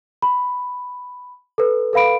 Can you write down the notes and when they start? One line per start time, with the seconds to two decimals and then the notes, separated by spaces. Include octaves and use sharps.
0.22 B5
1.58 A4 B4
1.93 A4 B4 F5 B5 D7